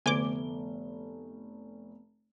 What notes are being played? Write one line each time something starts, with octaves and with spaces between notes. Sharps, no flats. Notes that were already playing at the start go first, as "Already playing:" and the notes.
F1 D3 A3 B3 G#5 D6 G7